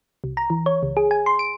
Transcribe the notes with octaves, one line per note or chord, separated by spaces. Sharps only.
C2
A#5
E3
C#5
C#2
G#4
G#5
C6
D7